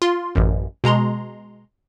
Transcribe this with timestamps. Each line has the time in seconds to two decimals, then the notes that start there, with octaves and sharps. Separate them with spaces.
0.02 F4 C6
0.35 A1 F#2
0.84 B2 G#3 A#5 C6